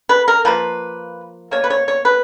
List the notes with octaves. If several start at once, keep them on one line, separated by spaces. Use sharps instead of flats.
B4
A#4
F3 A#3 B4
B2 A#3 C#5
B4
C#5
C#5
B4